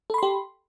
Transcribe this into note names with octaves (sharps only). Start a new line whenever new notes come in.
G4 A4 B5 C6